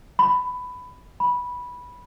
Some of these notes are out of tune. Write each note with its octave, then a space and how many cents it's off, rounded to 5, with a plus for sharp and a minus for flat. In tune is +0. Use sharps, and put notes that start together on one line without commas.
B5 +15
B5 -10